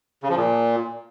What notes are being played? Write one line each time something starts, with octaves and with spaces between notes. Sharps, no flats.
C#3
F3
A#2